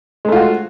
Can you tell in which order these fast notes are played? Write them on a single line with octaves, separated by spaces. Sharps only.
G#3 A3 F4 F#4